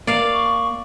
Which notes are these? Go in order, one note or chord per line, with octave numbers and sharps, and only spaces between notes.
A#3 D5 F5
C#6